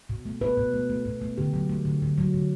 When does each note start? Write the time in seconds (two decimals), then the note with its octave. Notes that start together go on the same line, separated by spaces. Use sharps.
0.10 B2
0.26 A3
0.41 B2 B4
0.57 B2
0.73 A3
0.90 A3
1.05 B2
1.21 A3
1.37 D3 G4
1.54 F#3
1.69 A3
1.85 D3
2.02 D3
2.18 F#3
2.34 D3